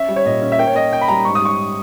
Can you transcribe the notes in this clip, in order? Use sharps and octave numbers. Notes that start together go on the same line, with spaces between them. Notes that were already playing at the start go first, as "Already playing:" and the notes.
Already playing: C#4 E5
G3
C#5
A#2 D#5
C#4
E5
A#3 G5
C#5
A#3 D#5
C#4 G5
B5
G3 A#5
G#2 C#6
D#6
G3 C#6